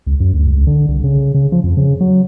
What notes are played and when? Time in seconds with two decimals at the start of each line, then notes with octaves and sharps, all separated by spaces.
0.07 C#2
0.20 F#2
0.33 D2
0.47 C#2
0.67 D3
0.88 C2
1.04 C#3
1.34 C#3
1.52 F3
1.64 F2
1.77 C#3
2.01 F#3